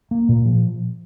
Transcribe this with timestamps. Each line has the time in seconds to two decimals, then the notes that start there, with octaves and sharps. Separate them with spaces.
0.11 A#3
0.29 A#2
0.45 F3